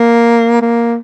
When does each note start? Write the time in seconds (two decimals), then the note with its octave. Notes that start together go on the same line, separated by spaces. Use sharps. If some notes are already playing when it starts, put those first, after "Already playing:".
Already playing: A#3
0.62 A#3